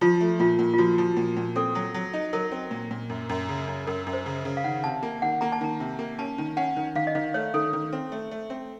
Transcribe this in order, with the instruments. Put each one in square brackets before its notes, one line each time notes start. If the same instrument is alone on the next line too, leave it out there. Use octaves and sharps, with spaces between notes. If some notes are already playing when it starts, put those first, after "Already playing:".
[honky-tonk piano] F3 [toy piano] F4
[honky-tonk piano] A3
[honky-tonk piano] A#2 [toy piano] F4
[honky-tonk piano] A#2
[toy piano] F4
[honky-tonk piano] F3 [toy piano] F#4
[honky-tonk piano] F3
A#2
A#2
[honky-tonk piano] C4 [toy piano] A4
[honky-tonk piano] F#3
F#3
D#4
[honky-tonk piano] F#3 [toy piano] A#4
[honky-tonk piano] C4
A#2
A#2
F#2
F#2
C#3
F#2
[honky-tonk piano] F#2 [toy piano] A#4
[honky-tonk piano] F#2
[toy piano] C5
[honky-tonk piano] C#3
C#3
[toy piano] F5
[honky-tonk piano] D#3 [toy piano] F#5
[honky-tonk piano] C3 [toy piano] A5
[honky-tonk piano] A#3
[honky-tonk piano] D#3 [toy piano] F#5
[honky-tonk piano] A#3 [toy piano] A#5
[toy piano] A5
[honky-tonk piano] D#3 [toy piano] A#5
[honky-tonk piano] C3
A#3
[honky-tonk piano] C#4 [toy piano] A5
[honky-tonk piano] D#3
[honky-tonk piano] C#4 [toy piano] F#5
[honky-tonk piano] D#3
[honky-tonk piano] D#3 [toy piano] F5
[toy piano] D#5
[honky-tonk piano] D#3 [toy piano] F5
[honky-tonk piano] A3 [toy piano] C#5
[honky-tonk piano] D#3 [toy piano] A4
[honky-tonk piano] D#3
C4
A3
A3
C4